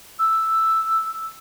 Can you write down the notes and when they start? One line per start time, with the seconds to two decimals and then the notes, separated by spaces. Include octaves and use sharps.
0.19 E6